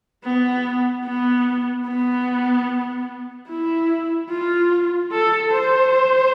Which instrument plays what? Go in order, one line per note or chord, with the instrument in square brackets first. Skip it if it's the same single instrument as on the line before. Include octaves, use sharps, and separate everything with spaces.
[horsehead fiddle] B3
B3
B3
E4
F4
A4
C5